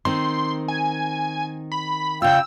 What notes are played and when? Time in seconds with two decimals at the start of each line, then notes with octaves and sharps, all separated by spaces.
0.05 D#3 C4 C6
0.68 G#5
1.72 B5
2.22 C#3 F4 F5 G5 E6